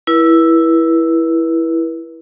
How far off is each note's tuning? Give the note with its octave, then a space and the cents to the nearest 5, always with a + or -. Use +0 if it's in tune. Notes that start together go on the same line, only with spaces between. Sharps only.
E4 +0 B4 -40